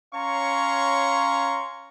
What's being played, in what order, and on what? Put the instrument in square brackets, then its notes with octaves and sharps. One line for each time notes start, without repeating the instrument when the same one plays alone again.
[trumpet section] C#4 C#5 F5 A#5 C6 C#6